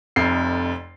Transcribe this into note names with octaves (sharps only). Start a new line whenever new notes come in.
F1 F2 C7